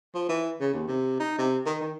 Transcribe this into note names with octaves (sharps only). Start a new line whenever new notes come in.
F3
E3
C#3
D#2
C3
D#4
C3
D#3
D#3